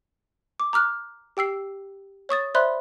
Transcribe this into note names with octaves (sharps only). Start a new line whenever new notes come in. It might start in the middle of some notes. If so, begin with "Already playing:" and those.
D6
A#5 D6 F6 F#6
G4 G5 E6 C7
C#5 C#6 D#6 A6
C5 D5 E5 B5 C6 F#6